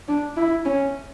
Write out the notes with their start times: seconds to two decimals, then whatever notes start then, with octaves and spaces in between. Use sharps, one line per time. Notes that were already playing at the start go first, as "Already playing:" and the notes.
0.08 D4
0.37 E4
0.66 C#4